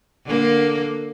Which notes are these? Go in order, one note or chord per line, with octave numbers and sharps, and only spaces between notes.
D3 A#3